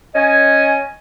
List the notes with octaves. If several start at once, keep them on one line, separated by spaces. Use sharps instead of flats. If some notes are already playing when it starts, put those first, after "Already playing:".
C#4 D#5 G#5